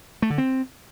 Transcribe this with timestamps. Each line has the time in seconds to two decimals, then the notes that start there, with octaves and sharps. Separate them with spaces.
0.22 A3
0.30 D3
0.38 C4